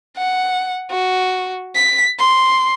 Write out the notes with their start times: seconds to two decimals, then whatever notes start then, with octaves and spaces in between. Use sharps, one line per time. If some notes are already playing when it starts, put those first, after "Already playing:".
0.17 F#5
0.91 F#4
1.76 B6
2.19 C6